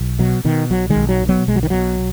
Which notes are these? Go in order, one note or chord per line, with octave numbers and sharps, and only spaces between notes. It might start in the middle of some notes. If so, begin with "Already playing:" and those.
Already playing: B1
B2 F#3
B2 D#3
B1 F#3
D#3 G#3
B1
F#3
B2
F#3 B3
B1 G#3
F#3
D#3
B2 F#3